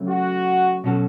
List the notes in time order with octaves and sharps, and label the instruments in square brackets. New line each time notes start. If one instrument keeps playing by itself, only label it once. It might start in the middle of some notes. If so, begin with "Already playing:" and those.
Already playing: [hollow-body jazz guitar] C#3 F#3 A3
[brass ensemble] F#4
[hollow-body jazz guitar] B2 F#3 C#4 F#4 A4